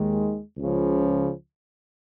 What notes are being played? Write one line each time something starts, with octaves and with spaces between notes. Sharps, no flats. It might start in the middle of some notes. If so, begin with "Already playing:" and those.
Already playing: D#2 D#3 G#3
C#2 C#3 F3